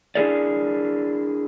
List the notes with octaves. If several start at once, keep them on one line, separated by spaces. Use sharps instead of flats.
D4 E4 F4 G#4 A#4 D5